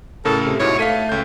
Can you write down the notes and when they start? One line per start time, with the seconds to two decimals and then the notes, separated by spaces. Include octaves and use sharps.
0.25 A2 C#3 A4 A#4
0.46 C3
0.60 G#2 B2 E4 C#5
0.79 A3 F5 B6 D#7
1.09 C#2 G6